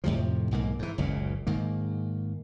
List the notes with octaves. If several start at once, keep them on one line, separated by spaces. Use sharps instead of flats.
F2 A2 C3 F3
B1 G#2 F3 A#3
G#2 E3
F#1 C#2 A#2 C#3
G#2 D#3 A#3